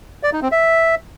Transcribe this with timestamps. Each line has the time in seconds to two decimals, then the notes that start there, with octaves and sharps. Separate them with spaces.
0.23 D5
0.33 D#4
0.42 C4
0.52 E5